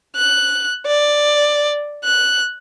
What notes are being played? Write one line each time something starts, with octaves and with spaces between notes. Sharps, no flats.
F#6
D5
F#6